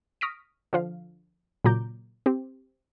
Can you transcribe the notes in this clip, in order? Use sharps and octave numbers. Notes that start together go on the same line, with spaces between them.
C#6 D#6 F6 A#6 B6 D7
D3 F3 F5
A#2 C#3 F#3 A#5 D6 G6
C4 G4